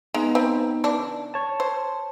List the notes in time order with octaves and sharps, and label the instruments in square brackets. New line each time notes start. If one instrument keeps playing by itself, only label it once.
[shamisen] G#3 [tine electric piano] B3 D#4
[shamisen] C4 B4
C#3 E3 D4
[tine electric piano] C#5 A5
[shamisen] C5